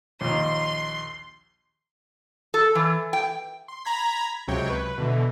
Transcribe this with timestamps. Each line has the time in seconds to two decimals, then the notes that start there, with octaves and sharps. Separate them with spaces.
0.21 A#1 D#2 C6
2.54 A4
2.75 E3
3.13 G5
3.68 C6
3.85 A#5 B5 G#6 B6
4.48 C#2 C3 F#3 C#5 G5
4.70 B4
4.98 B2 D3 E3